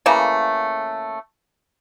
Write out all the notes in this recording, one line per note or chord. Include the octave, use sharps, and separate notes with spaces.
C#3 E3 A3 A#3